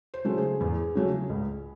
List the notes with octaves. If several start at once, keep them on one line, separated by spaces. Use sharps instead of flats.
C5
C#3 F#3 A3
G#4
E2 G#4
C#3 F#3 A3
C#2